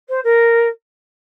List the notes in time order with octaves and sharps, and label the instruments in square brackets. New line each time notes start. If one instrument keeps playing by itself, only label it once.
[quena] C5
A#4